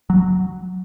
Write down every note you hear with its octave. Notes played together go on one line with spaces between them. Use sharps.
F#3